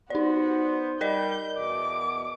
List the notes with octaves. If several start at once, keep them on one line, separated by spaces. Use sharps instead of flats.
B3 D#4 F#4 C5 D5
G3 A#4 D5 D#5 G6
E2 B2 D6